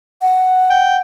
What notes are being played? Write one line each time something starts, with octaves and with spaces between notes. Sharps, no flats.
F#5
G5